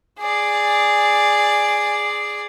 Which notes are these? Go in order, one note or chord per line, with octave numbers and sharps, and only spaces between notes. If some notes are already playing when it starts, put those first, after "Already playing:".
G#4 D5